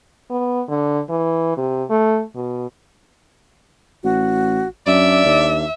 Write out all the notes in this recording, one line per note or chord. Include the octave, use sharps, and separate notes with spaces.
B3
D3
E3
C3
A3
B2
A1 F#4
F#2 D4 D5 E5
D#2